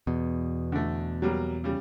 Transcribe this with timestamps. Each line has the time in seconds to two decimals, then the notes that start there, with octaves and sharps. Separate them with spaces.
0.07 E2 B2
0.72 D3 A3
1.22 F#3 G3 A#3
1.64 C#3 G3